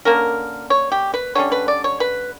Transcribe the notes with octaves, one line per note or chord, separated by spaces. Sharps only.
D3 A#3 C#4 A#4
C#5
G4
B4
D3 G3 C#4 C#5
B4
D5
C#5
B4